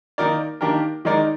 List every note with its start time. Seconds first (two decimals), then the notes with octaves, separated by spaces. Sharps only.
0.18 D#3 A#3 D#4 A#4 D5
0.61 D#3 A#3 D4 G4 A#4
1.05 D#3 G#3 D#4 A#4 D5